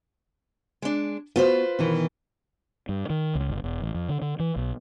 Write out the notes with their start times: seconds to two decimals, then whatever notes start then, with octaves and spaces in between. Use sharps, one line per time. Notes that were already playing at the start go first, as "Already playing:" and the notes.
0.82 G#3 D4
1.36 B3 F4 F#4 B4 C5
1.79 B2 D#3 E3
2.89 G2
3.10 D#3
3.35 C#2
3.50 G1
3.64 E1
3.82 A1
3.95 F2
4.09 D3
4.22 D3
4.39 E3
4.56 B1